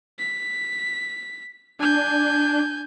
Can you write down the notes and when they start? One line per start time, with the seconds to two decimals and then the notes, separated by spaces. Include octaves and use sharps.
0.19 B6
1.80 D4 G#5 G6